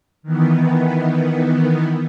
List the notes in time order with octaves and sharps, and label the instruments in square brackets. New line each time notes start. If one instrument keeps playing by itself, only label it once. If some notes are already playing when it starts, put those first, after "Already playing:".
[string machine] D#3 E3 B3